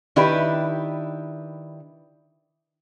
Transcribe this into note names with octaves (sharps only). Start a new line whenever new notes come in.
D#3 D4 E4 G4 B4